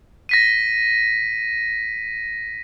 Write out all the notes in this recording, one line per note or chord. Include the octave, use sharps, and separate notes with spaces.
A#6 B6 D#7